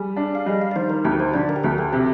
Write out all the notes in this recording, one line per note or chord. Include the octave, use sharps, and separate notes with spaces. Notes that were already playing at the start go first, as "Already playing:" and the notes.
Already playing: G3 G#4
D4
F5
G3 D#5
F5
D5
D#3 C5
A#4
D2 G4
C5
D3 D5
A#4
G4
D2 G#4
G4
C3 G4